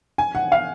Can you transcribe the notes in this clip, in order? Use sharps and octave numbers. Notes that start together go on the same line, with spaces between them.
G#5
F#5
F5